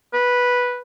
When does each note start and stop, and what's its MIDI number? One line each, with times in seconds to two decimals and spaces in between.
0.14 0.82 71